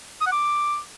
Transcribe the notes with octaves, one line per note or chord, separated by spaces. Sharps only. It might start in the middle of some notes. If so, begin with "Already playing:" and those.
D#6
F#5
D6